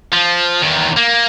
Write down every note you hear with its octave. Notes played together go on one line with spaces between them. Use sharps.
F3
E2 D#3
A#3